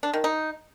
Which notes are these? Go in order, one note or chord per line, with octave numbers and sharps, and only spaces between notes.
D4
D#3
D#4